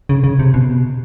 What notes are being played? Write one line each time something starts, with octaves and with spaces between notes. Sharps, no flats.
C#3
C#3
C3
B2